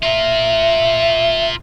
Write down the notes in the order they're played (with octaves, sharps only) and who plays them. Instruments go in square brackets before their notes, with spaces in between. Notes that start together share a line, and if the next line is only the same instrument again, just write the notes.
[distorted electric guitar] F4 A#4 [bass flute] E5